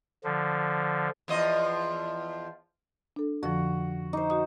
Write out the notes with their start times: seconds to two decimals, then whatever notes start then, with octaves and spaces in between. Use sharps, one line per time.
0.24 D3 F3
1.28 E2 F3 D#5
3.16 D4 A4
3.43 F2 D3 F3 F#4
4.13 D#4 C5 D6
4.30 F#4 D#6